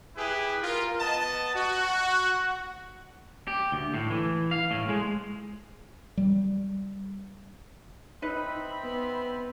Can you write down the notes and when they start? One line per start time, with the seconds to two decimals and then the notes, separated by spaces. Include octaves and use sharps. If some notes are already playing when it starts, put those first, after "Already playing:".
0.17 E4 G4 G#4 B4
0.63 F4 A#4
1.00 B3 D#5 A5
1.55 F#4
3.48 G4
3.72 D2
3.94 A2
4.10 E3
4.51 F5
4.71 A2
4.89 G#3
6.17 G3
8.22 C4 D#4 B4 E5 B5
8.83 B3